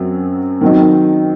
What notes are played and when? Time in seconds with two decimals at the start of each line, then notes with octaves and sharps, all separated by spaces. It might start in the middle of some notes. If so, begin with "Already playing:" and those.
Already playing: F#2 F#3 C4
0.61 D#3 F#3 C4 D#4